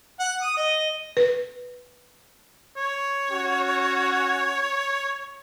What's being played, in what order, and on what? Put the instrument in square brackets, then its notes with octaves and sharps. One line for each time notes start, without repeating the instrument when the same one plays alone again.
[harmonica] F#5
D#6
D#5
[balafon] B4
[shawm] C#5
[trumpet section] C#4 F#4